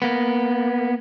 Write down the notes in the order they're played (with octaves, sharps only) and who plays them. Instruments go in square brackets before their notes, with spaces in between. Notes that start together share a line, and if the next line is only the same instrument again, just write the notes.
[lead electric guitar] A#3 B3